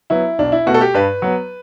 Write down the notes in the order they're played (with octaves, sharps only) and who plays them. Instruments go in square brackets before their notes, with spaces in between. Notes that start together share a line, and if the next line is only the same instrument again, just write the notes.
[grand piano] F#3 B3 E4
B1 D4
E4
B2 A3 F#4
A4
G4
G2 B4
F#3 B3